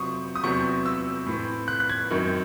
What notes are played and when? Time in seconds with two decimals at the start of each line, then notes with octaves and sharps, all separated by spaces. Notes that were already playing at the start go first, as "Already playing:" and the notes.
Already playing: C3 F#3 C4 C#6 D#6
0.36 D#6
0.43 E2 C3 F#3 C4 C#6
0.86 E6
1.26 A2 E3 C4
1.68 F#6
1.80 F#6
1.89 G#6
2.10 F#2 D#3 F#3 C4